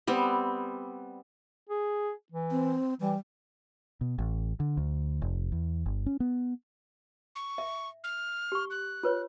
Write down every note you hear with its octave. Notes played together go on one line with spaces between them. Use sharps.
G3 B3 C4
G#4
E3
C4
E3 G3
B2
A1
D3
D2
F1
E2
G1
C#4
B3
C#6
E5
F6
G4 C#6
F#6
F4 B4 C#5